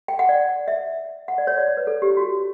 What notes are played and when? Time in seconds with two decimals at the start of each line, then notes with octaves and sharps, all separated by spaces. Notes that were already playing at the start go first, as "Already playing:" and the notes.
0.08 G5
0.19 F#5
0.29 D5
0.68 E5
1.28 F#5
1.38 D5
1.47 C#5
1.58 D5
1.68 C#5
1.77 B4
1.87 A4
2.02 G4
2.10 E4
2.17 F#4